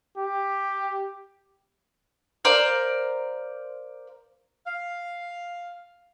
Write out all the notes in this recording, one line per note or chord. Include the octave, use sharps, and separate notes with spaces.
G4
A#4 C5 D5 F5
F5